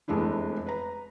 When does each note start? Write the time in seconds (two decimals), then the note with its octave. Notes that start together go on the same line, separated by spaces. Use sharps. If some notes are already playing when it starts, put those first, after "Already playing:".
0.08 F1 E2 G#3 A3 D4 E4
0.66 B4 A#5